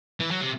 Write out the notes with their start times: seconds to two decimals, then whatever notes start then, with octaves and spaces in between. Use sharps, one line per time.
0.20 E3
0.31 F#3
0.41 C3